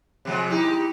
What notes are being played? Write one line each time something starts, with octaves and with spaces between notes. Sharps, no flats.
C3 F3 G#3
D#4 E4 G4